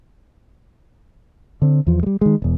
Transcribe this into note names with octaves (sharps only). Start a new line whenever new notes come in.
D3 C4
E2 F3
G3 G#3
D#3 G#3
E1 E2